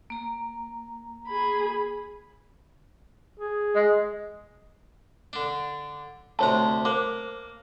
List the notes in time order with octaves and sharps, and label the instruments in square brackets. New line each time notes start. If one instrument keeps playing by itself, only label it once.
[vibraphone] A#3 A#5
[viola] G#4 B5
[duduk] G#4
[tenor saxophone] G#3
[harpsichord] D3 D4
[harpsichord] D2 C3 A#5 [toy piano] C5 C#5 A5
[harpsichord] A#3 [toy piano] C5 D6